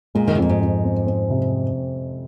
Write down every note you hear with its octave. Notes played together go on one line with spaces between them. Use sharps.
A#2 G#3
D#3
C3
F2 A#2
G#2
F2
C4
C4
C3